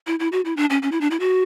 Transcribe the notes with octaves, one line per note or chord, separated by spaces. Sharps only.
E4
E4
F#4
E4
D4
C#4
C#4
E4
D4
E4
F#4